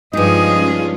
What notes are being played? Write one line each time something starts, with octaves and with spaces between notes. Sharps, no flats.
G2 F3 G#3 C#4 D#4 F4 G#4 D#5